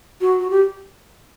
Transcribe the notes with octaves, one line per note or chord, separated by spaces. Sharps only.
F#4
F#4
G4